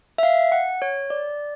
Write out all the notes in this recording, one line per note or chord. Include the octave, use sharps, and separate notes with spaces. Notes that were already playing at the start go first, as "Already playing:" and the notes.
E5
F5
F#5
C#5
D5